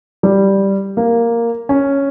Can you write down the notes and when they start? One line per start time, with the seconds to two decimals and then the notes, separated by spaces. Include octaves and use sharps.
0.23 G3
0.97 A#3
1.69 C#4